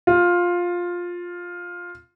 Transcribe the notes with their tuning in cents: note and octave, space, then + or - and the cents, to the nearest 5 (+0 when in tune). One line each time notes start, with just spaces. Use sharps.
F4 +10